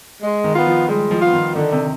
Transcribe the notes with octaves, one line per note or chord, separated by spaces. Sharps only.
G#3
D#3
B3 F4
F3
G3 G#3
F3
B3 F4
D#3
D3 D#3
C3